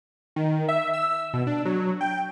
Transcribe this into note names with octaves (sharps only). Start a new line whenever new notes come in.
D#3
E5
E6
B2
D4
F#3
G5